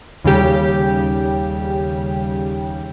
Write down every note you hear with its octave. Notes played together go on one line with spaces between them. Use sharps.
D#2 C#3 G3 G4